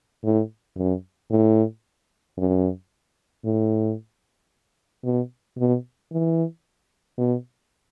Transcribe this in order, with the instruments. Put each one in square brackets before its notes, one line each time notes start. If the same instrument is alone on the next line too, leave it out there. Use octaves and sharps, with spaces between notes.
[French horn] A2
F#2
A2
F#2
A2
B2
B2
E3
B2